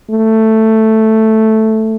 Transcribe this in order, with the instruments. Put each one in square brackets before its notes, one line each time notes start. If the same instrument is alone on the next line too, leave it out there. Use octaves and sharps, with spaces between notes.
[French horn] A3